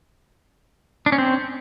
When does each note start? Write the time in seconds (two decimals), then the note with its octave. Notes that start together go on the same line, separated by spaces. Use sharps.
1.06 D4
1.12 C#4
1.18 C4